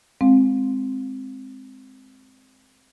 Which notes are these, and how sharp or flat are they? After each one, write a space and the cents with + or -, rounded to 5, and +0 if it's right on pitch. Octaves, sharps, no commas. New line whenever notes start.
G#3 +0 C4 +0 F5 +25